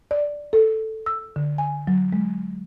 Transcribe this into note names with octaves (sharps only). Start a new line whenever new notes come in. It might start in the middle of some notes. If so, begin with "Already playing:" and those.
D5
A4
E6
D3
G#5
F#3
G#3